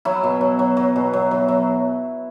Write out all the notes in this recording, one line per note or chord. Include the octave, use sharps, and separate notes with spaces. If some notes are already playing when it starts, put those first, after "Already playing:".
F#3 E4
B2
F#3
F#3
F#3
B2
F#3
F#3
F#3